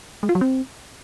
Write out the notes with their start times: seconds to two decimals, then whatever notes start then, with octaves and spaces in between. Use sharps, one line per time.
0.23 G#3
0.29 F4
0.35 F#3
0.41 C4